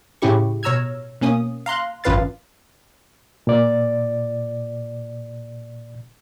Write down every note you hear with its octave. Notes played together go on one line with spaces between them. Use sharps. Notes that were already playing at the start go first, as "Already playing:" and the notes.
A2 C#3 C#4 E4 G4 C#6
B2 C#5 A#5 E6 F6 G#6
B2 A#3 C#4 D#6
F5 A#5 C6 F#6
G#1 F#2 F4 B4 F5 A6
A#2 D5